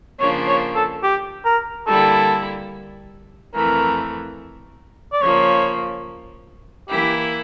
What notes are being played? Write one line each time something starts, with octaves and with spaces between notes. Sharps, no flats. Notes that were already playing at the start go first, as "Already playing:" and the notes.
C#3 F3 A#3 D4 C#5
C#5
A4
G4
A#4
D3 G3 A#3 E4 A4
F2 E3 A3 A#4
D5
C#3 F3 A#3 C#5
E3 A#3 E4 G4